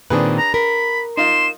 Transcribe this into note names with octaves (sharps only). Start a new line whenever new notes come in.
A#2 D#3 C4 D4 G#4 B4
A#5
A#4 B5
D#4 F4 C6 E7